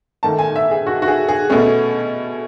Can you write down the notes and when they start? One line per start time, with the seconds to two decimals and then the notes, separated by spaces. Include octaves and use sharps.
0.23 G#2 D#3 A3 A5
0.39 G#5
0.56 E5
0.71 G#4
0.87 F#4
1.02 F#4
1.08 G#4
1.29 G#4
1.50 B2 A3 C#4